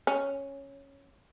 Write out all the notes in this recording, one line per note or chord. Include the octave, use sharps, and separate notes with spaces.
C#4